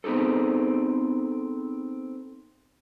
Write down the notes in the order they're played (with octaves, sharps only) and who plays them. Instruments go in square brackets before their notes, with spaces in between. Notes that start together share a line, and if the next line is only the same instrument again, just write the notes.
[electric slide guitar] B3 C4 D#4 G#4 A4